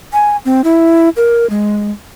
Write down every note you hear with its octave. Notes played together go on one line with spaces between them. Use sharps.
G#5
C4
E4
A#4
G#3